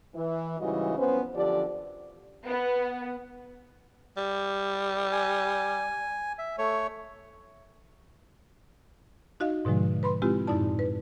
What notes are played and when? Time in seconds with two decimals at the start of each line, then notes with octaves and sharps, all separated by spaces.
0.15 E3
0.59 G#2 C#3 E3 G3 F#4 D#5
0.98 F2 B3 C#4 B4 C5
1.35 F#2 D3 F3 G4 D5
2.46 B3
4.17 G3
5.12 G#5
6.38 E5
6.58 A3 C#5
9.40 D#4 F#4 D#5 F5
9.65 G#2 B2 D3 F3 G#3
10.03 B4 B5 C6
10.22 G#3 C4 E4 F4 G4
10.47 F#2 A2 D#4 E4 D5 A5
10.79 B4